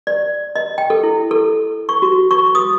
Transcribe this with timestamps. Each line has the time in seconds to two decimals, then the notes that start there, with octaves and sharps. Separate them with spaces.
0.07 D5
0.56 D#5
0.78 G5
0.90 A4
1.03 E4
1.31 A4
1.89 C#6
2.02 F#4
2.31 C#6
2.55 D#6